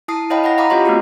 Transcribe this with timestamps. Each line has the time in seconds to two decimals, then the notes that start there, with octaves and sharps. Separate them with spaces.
0.08 E4 A5 D#6 C7
0.30 E4 C#5 D#5 F5 G5 B5
0.44 D#5 F#5 B5 A#6
0.58 D#5 F5 A#5 B5 D6 D#6
0.70 C#4 F4 G4 C#5 D#5 C6
0.85 A3 B3 C4 F4 F#4 G#4